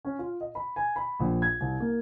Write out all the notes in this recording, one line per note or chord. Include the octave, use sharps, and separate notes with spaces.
C#4
F4
D#5
B5
G#5
B5
A#1
G#6
C2
A#3